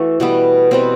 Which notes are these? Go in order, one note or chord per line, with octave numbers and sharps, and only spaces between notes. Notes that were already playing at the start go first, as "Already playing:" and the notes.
Already playing: E3 A3 F#4 A4
B2 G3 B3
B2 G3 B3 C4